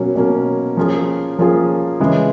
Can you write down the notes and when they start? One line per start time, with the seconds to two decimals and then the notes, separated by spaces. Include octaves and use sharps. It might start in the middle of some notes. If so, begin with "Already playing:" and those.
Already playing: B2 F#3 A#3 C#4
0.15 B2 F#3 A#3 C#4
0.77 F3 A#3 C#4 F4 G#4
1.39 F3 A#3 C#4 F4 G#4
2.00 C#3 E3 G#3